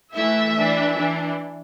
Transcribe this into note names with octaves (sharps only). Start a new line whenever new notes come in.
E3 A3 E4 E5
E3 D4
E3 D4